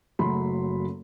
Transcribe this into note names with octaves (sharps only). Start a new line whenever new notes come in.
F#1 F#2 F#3 A3 B5 C6